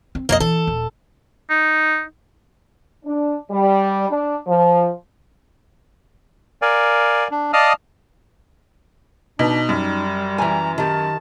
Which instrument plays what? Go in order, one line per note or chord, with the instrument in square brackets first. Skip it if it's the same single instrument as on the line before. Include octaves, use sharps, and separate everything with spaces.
[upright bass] C4
[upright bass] B1 F2 [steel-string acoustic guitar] A#3 C#5 D#5
[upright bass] E3 [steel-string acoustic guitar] A4
[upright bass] D#1
[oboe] D#4
[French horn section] D4
G3
D4
F3
[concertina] A#4 D5 F5 G#5
D4
D5 D#5 F5 A5 D#6 F6
[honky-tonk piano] B2 [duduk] D4 [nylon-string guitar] D#4
[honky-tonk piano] F#2 [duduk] G3
[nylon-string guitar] E3 G#5 [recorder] A#5
[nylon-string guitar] D#3 G4 [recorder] A5